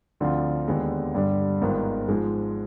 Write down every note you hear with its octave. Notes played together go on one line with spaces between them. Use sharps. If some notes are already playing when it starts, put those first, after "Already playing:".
D2 D3 F3 C4 F4
D#2 D3 G#3 B3
G2 D3 G3
G#1 G#2 D#3 B3 F4
G#2 F3 G#3